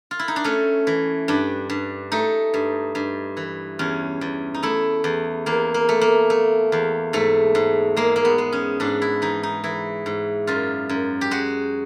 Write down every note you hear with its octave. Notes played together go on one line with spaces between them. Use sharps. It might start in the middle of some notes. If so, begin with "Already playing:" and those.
F4
E4
D#4
D4
A3 C#4
E3
G2 D4
G2
A3 D#4
G2
G2
E3
E2 C#4
E2
D#4
A3 E4
E2
E2 A#3
A#3
A3
A#3
A3
E2
G#2 A3
G#2
G#3 A#3
A#3
B3
G#3
C#4
G#2 D4
E4
E3 D#4
D#4
E3 E4
G#2
F#2 F4
F#2
G4
G#3 F#4